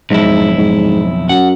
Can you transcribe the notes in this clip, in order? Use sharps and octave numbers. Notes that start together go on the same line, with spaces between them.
B1 F2 G#2 E4
G#2
F#2 F#5